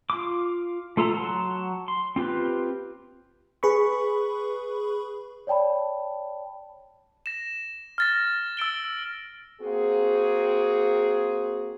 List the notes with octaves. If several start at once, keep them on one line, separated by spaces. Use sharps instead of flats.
F4 D6
A3 F4 A4 A#5
F#3 F#5 A5 A#5 C6
C6
C4 F4 G4 B4
G#4 B4 B5 C#6
C#5 D5 G5 A5 B5
A#6 E7
F6 A6 A#6
E6 A6 D7 G7
A#3 C4 F#4 G#4